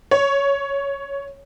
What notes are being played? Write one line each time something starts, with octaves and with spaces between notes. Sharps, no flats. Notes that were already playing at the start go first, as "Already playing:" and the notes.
C#5